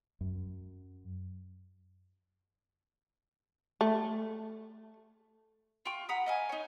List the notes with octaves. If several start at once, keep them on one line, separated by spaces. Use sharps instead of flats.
F#2
A3
F4 G5 C#6
F#5 A#5 B5 D#6
D#5 F5 G#5
D#4 C#5